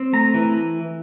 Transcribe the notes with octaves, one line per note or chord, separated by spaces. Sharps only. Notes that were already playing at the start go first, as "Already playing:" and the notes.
Already playing: C4
A3 A#5
E3